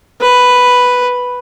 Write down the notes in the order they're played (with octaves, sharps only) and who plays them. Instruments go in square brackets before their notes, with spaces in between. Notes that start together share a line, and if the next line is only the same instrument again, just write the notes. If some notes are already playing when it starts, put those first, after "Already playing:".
[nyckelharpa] B4